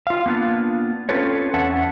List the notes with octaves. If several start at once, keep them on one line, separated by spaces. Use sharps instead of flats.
F4 F5
A#3 B3 D4 F4
C4 C#4 F4 A4 B4 C#5
E2 C#4 E5 F#5 A5